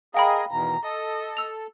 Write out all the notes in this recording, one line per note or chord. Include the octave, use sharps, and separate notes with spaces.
G#4 A#4 D#5 F5 G5 B5
E2 B2 D#3 A#5
A4 D#5
E6 F7